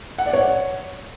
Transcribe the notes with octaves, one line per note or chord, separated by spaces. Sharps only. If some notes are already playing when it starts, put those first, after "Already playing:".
F#5
D5
C#5